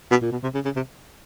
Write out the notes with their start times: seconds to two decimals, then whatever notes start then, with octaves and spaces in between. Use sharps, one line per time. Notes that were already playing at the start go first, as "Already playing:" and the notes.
0.11 B2
0.22 A#2
0.32 B2
0.43 C3
0.54 C#3
0.65 C#3
0.76 C3